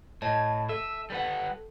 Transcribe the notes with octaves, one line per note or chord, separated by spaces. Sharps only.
A2 C#5 D#5 A5
A4 E5
G3 B4 F#5